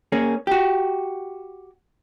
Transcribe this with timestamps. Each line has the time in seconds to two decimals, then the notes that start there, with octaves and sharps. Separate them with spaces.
0.12 A#3 C#4 G#4
0.47 F#4 G4